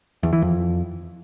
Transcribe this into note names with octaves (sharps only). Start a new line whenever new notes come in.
E2
E3
F2